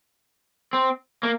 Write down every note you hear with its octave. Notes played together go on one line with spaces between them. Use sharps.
C4
A#3